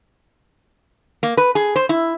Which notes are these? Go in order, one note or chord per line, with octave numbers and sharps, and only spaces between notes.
A#3
B4
G#4
C5
E4